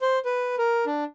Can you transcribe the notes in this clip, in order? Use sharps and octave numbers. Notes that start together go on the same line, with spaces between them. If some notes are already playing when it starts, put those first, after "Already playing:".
C5
B4
A#4
D4